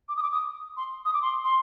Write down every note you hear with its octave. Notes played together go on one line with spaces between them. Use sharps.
D6
D#6
D6
D#6
C6
D#6
D6
C6
C6